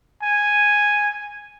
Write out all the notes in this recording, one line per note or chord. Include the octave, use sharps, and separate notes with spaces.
G#5